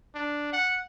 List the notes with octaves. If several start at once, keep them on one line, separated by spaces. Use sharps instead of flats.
D4
F#5